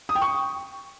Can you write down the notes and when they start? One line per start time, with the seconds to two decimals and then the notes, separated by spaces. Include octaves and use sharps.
0.09 D#6
0.15 G5
0.21 C#6